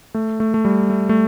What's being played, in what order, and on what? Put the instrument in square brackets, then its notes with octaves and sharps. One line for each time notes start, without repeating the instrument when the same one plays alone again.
[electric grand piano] A3
A3
A3
G3
A3
A3